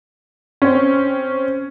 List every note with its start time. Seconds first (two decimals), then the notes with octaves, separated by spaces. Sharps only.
0.62 C4 C#4